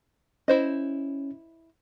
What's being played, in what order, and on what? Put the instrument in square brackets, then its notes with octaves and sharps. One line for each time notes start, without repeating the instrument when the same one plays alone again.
[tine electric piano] C#4 [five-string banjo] E4 C5 D#5